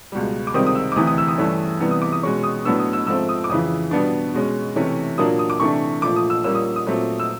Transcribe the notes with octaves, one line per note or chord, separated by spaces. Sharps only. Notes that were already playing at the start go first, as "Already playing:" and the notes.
C#2 B2 G3
D6
C#2 C3 D#3 G3 C4 D#6
D#6
E6
D6
D2 C3 E3 D#6
D#6
E6
D#6
G2 E3 A3 C#4
C3 E3 G3 B3
D#6
D6
D#6
B2 G#3 C#4 C#6
D#6
A2 F#3 B3 D4 E6
D#6
E6
G#2 F3 A3 C4 E6
D#6
D6
F2 C#3 E3 D#6
B2 G3 B3 D4
B2 G#3 C#4
C3 E3 A3 C#4
A#2 F#3 A#3 D4 D#6
D#6
D6
C3 E3 A3 D4 C#6
A#2 F3 A3 D6
D#6
E6
A#2 G3 A#3 C#4 E6
D#6
D#6
A#2 F#3 A3 C4
E6